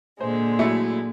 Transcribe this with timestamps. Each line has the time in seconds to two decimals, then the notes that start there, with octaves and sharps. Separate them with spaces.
0.21 A#2 D3 G#3 C5
0.59 F#3 A3 E4